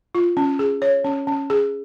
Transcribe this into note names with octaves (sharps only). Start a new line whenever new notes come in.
F4
C#4
G#4
C#5
C#4
C#4
G#4